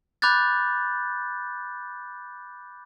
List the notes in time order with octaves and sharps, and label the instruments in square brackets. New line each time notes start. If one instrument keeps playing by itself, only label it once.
[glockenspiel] B5 D6 F#6 G6 A6